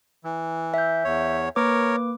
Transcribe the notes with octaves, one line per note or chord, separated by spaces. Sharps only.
E3
E5 G6
E2 C#5
A#3 A#4 B4 C#5 D6